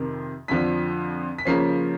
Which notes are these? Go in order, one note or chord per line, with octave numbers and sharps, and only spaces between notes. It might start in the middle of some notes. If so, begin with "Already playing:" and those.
Already playing: F2 C3 D#3
F2 D3 F3 B6
B6
C#3 F3 A#3 C#4 C7